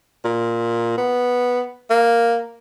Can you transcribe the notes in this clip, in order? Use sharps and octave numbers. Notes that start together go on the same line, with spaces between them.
A#2
B3
A#3